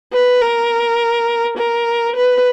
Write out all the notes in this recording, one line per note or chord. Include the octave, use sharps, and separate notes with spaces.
B4
A#4
A#4
B4